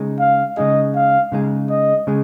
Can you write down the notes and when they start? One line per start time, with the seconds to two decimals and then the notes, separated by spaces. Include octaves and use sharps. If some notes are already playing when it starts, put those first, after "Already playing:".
Already playing: C#3 G#3 D#4 G#4
0.19 F5
0.57 C#3 G#3 D#4 G#4 D#5
0.95 F5
1.32 C#3 G#3 D#4 G#4
1.70 D#5
2.07 C#3 G#3 G#4